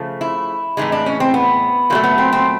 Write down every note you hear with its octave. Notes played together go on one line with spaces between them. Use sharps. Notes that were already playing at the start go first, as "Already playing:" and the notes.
Already playing: C#3 F3 A3
E4
A2 E3 G#3 D#4
D4
C#4
C4
B3
A#2 F#3 A3 A#3
B3
C4
C4